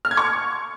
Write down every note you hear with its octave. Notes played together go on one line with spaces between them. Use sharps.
F6
G#6
C#6